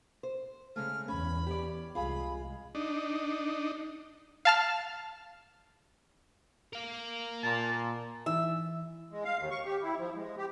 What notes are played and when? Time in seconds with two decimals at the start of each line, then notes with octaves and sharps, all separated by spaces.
0.23 C5
0.76 C#3 G#3 A3 F6
1.08 E2 C#4 B5
1.47 G4 C#5 D5
1.95 C2 G#3 F4 G#4 F5 B5
2.75 D4 D#4
4.45 F5 A5 F6
6.73 A#4 F5
7.43 A#2 A5
8.26 E3 E5
9.11 G#3
9.24 F5
9.38 D#2
9.51 C#6
9.65 G4
9.82 E4
9.99 F3
10.16 G#3
10.38 G4